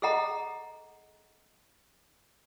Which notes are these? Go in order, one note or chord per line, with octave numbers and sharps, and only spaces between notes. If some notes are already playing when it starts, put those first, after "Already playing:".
G#4 A4 D#5 F#5 A#5